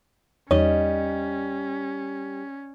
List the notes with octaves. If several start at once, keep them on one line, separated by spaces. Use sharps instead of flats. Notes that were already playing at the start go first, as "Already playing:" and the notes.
E2 G3 C#4 D#4 C#5 D#5